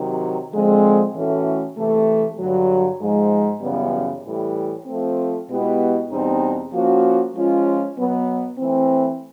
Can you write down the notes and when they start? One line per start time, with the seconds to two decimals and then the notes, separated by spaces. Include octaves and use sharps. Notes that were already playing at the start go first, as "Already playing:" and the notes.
Already playing: C3 D#3 F#3
0.52 D3 F3 G#3 C4
1.14 A2 E3 A3 C#4 F#4
1.76 C3 E3 A3
2.38 G2 D3 F#3
3.00 G#2 F3 G#3
3.61 F#2 C#3 E3 G3 B3
4.23 A2 E3 G3
4.86 F3 A3 C4
5.48 B2 G#3 B3 E4 G4
6.10 E2 B2 G3 C4 D#4
6.72 F3 A#3 C#4 F#4
7.34 F3 G#3 C#4 F4
7.97 B2 F#3 B3
8.58 E3 A3 C4